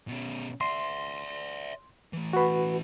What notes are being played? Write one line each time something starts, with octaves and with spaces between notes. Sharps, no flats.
B2 C#4
D5 E5 C6
A2 E3
F#4 B4